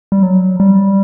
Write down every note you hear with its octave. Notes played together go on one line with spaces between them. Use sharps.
G3
F#3
G3